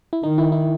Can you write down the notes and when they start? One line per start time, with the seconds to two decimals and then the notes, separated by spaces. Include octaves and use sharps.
0.13 E4
0.23 D#3 D#4
0.38 E4
0.52 E4